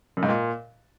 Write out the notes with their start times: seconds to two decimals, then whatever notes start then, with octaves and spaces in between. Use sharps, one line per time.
0.17 F#2
0.23 G#2
0.28 A#2